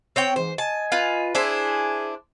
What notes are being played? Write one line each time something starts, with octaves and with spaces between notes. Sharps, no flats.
C4 C#5 G5
G#2 E3 C5
D#5 G#5 A5
F4 B4
D4 E4 G#4 C5 G#5